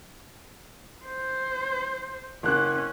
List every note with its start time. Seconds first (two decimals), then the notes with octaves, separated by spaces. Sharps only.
1.05 C5
2.43 F#1 C#4 F#6